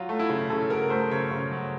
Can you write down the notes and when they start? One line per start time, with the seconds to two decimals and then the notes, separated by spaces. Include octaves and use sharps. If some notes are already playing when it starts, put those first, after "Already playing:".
Already playing: F#3 F4
0.09 A3
0.19 E4
0.29 C#3
0.50 C#3 A4
0.70 F#3 A#4
0.90 A3 C5
1.11 C#3 C#5
1.31 C#3
1.51 F#3